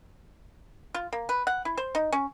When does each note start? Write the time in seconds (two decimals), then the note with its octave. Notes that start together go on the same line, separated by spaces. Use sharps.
0.94 F4
1.12 A#3
1.29 B4
1.47 F#5
1.65 E4
1.77 C5
1.95 D#4
2.12 C#4